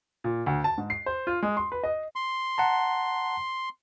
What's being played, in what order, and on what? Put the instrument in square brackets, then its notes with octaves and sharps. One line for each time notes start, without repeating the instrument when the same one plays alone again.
[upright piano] A#2
D2
A5
G#2
C7
C5
F4
G#3
C6
B4
D#5
[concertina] C6
[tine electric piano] F#5 A5 A#5